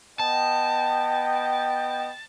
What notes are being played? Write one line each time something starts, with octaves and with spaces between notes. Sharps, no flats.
B3 D#5 G5 A5